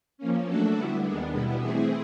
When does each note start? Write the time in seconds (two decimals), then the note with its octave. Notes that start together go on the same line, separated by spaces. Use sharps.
0.18 F3 A#3 C#4
0.46 F#3 A3 D4 F#4 A4
0.74 D3 G3 B3 E4
1.02 D#2 D#3 G#3 B3 D4
1.31 B2 G3 B3 E4
1.60 E3 A3 C4 E4 G#4